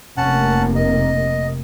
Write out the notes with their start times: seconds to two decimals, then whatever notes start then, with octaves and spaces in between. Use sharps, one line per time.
0.17 F1 C3 A#3 C#4 F#5 A5
0.75 D#5